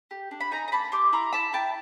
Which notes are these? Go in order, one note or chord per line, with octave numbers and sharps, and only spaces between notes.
G4
D4
B5
D#4 G#5 A#5
A#5
A#3 A5 B5
G4 C6 D6
E4 A#5 C6
E4 A5 B5
E4 G5 A5